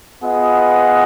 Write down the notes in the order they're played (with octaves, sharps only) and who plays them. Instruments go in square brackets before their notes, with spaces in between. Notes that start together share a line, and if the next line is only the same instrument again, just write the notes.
[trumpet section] B3 F4 G#4 D#5 F#5